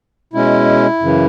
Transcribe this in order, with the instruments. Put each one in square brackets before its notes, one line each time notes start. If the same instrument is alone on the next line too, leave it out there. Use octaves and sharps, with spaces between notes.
[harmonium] B2 G#3 C#4 E4
F#2 C#3 E3